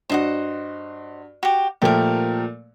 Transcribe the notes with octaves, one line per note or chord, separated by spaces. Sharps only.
G2 F#4 C5 D#5 F#5
F#4 G4
A#2 F3 A3 G4 A#4